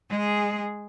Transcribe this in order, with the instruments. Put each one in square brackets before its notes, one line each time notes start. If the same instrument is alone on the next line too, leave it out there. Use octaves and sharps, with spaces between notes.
[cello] G#3 G#4